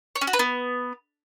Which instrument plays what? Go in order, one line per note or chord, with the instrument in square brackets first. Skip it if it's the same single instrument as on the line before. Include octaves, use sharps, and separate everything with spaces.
[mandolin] C#5
C#4
F#4
B4
B3